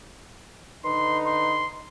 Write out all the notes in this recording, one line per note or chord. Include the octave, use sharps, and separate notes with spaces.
D3 D#4 B4 C6
C6